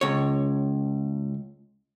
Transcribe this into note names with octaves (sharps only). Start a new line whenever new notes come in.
C#2 C#5